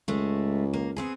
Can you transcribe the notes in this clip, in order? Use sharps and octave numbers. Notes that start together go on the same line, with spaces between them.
C#2 G#3 A3
A#3
B3 C4 G#4